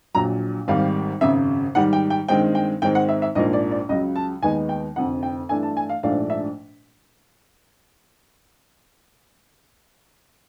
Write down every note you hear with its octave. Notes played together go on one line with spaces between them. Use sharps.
A#1 A#2 F#3 A#5
G#1 G#2 D#3 G3 F5
G#1 F#2 C#3 E5
G#2 D#3 G3 F#5
G5
G5
G2 D#3 G#3 C4 G5
G5
G#2 D#3 G#3 C4 G5
F#5
E5
E5
A#1 G#2 F3 A#3 D#5
D5
D5
C#2 C#3 F#3 D#5
A5
D#2 D#3 G#3 B3 D#4 G#5
G5
F1 F2 D3 F#5
G5
G2 E3 A3 D4 G#5
A5
G#5
F5
A#1 G#2 F3 A3 D4 F5
E5